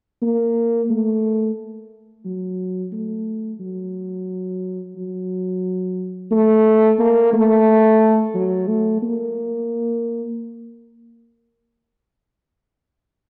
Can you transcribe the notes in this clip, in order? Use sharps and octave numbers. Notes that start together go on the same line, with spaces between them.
A#3
A3
F#3
A3
F#3
F#3
A3
A#3
A3
F#3
A3
A#3